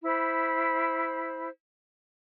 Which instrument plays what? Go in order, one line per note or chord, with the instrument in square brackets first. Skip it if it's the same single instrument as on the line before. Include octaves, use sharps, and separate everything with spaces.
[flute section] E4 C5 B5